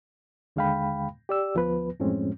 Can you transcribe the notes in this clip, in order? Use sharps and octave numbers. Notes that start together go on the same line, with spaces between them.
D#2 D3 G#3 F5 G5 B5
G4 D5 E6
D2 F3 B3 B4
F#2 A2 F3 G#3 C4 C#4